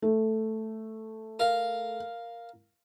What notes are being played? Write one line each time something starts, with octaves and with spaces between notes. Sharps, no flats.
A3
A#4 F5